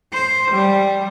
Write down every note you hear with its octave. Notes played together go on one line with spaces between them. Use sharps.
C5
G3